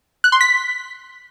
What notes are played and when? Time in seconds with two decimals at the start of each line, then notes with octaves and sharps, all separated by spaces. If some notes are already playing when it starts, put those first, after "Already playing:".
0.24 F#6
0.32 C6
0.41 B6